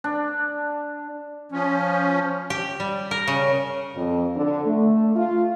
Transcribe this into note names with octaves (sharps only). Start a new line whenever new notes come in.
D4
F3 C#4
G4
G3
A#4
C#3
F2
D3
A3
F4